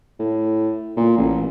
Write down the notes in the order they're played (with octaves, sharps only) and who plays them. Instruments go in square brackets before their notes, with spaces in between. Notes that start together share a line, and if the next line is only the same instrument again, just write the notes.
[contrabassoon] A2
A#2
A1